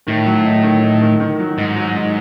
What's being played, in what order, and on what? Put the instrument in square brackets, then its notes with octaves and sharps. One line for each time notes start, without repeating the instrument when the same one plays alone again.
[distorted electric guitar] A2 [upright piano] D#3
[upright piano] F#3
D#4
D#3
D#4
D#3
D#3
F#3
[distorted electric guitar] G#2 [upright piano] D#4
[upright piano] F#3
D#4